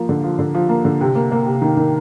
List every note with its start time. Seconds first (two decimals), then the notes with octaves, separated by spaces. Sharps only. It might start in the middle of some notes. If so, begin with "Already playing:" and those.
Already playing: F3 A#3
0.09 D3
0.24 F3
0.39 D3
0.55 F3
0.69 A#3
0.85 D3
1.01 C3
1.15 A#3
1.31 A#3
1.46 C3
1.62 D#3
1.77 D#3